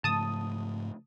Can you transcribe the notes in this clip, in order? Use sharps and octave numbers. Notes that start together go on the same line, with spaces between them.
G#2 C#3 F3 A3 A5 D#6